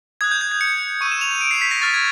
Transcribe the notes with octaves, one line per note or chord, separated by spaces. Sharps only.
D#6 F#6 G#6
G6
G#6
G#6
C#7
C#6 E6 G6 D#7
E7
F7
D#7
D7
C7
B6
A#6
C#6 F6 A6
G#6